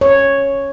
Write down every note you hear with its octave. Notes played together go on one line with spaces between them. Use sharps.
C#5